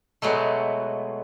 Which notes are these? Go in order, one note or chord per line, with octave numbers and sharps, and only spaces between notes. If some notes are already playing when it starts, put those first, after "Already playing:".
B2 F#3 G#3 A3